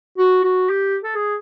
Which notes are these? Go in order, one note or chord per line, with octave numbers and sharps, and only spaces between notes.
F#4
F#4
G4
A4
G#4